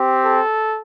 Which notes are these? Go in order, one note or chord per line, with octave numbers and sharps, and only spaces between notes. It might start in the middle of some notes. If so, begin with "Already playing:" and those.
Already playing: C4 G4
A4